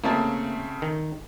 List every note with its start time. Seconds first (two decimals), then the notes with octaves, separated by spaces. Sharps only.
0.04 C#3 A3 A#3 C4 A5
0.82 D#3